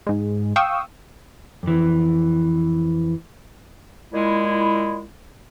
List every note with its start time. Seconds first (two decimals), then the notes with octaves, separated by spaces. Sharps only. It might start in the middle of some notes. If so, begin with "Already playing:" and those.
0.07 G#2 G#3
0.56 F5 G5 C#6 D#6 E6
1.63 F2 E3
4.13 A#2 G#3 E4